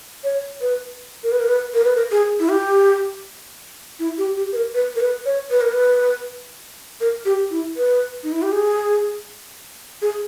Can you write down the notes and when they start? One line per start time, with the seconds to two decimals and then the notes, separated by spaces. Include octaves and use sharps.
0.24 C#5
0.61 B4
1.23 A#4
1.32 B4
1.40 A#4
1.48 B4
1.74 A#4
1.84 B4
1.96 A#4
2.11 G#4
2.40 E4
2.49 G4
3.99 E4
4.18 G4
4.37 G4
4.52 B4
4.56 A#4
4.74 B4
4.96 A#4
5.00 B4
5.26 C#5
5.51 B4
5.61 A#4
5.72 B4
7.01 A#4
7.25 G4
7.51 E4
7.77 B4
8.24 D#4
8.32 E4
8.42 G4
8.52 G#4
10.02 G#4